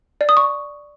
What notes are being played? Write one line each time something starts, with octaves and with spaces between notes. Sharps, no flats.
D5
D#6
C#6